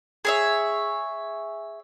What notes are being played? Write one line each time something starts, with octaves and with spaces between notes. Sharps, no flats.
G#4 C#5 E5